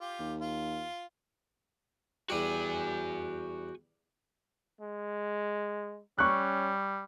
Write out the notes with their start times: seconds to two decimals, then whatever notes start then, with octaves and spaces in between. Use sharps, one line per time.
0.01 F4 G4
0.19 D#2
0.41 F4
2.30 E2 G3 F#4 G4 G#5
4.81 G#3
6.19 G3 C#4 C#6 F#6